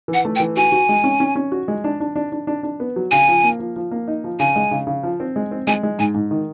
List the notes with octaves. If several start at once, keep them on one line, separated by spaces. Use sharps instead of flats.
E3
F#5
A3
G5
E3
F#4 G#5
F#4
G#3
C#4
C#4
C#4
F#4
G#3
D4
D4
D4
D4
D4
D4
B3
F#3
C#3 G#5
F3
A#3
F3
F3
A#3
D#4
F3
C#3 G#5
G#3
C#3
C#3
F3
C4
G#3
C4
G#3 G#5
G#3
G#2 G#5
G#2
D#3